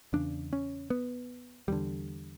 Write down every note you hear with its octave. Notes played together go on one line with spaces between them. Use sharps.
E2 C#3 D4
C#4
B3
E2 D3 G3